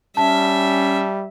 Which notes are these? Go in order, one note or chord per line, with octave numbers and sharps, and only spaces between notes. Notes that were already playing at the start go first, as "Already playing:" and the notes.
G3 C#4 E5 A5